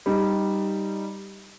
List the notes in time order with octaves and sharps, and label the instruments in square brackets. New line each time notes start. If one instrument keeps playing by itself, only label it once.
[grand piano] G3 D#4